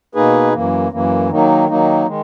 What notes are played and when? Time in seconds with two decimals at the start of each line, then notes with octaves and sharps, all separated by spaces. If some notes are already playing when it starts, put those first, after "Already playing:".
0.15 B2 A#3 D#4 G#4 B4
0.53 F#2 E3 A#3
0.92 F#2 E3 A#3
1.29 D#3 F#3 A#3 D#4
1.68 D#3 F#3 A#3 D#4
2.06 D#3 G#3